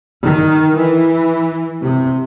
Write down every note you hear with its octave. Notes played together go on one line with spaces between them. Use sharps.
D#3
E3
C3